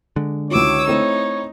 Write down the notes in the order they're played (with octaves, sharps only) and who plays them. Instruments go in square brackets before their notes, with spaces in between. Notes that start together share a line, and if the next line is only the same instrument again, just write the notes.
[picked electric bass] D3 G#3
[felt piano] C#2 E4 F#4 [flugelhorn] C#5 [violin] D6 E6
[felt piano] A3 C4 E4 [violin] D#4